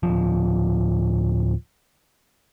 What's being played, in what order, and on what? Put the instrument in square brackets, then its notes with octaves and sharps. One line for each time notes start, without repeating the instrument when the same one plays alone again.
[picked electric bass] D1 B1 F3